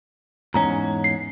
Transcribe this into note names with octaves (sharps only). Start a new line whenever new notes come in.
E2 G#2 C#4 A#5
C7